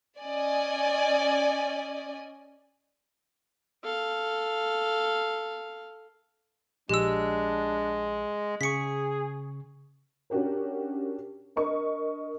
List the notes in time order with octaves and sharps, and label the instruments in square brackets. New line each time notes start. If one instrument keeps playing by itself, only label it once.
[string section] C#4 D5 D#5 G#5
[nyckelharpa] A4 F5
[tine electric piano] A#1 [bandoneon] G#3 [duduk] D4 [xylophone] G4 E6
[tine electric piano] C#3 C#6 [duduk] G#4 [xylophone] B6 C#7
[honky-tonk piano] C#4 D4 F#4 G4 A#4
D4 A#4 D#5 C#6